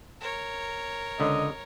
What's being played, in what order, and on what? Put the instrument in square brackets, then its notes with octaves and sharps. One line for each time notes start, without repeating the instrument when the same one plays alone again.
[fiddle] A#4 C#5
[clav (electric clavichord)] C#2 D3 [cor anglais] D#5